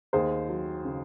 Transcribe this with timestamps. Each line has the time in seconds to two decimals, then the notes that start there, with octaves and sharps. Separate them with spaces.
0.13 D#2 G#4 C5
0.49 F#3
0.84 C#3